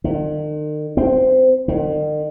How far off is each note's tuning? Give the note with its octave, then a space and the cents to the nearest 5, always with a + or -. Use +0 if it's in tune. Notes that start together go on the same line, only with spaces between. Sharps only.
D#3 -45
C4 -15
D#3 -45